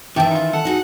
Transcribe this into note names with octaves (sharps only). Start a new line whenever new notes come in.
D#3 E3 G4 E5 G5 A5
D#4 F4
A4 F#5
D#4 F#4 G#4